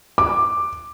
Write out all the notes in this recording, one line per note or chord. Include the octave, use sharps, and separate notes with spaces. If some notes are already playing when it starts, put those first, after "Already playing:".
D6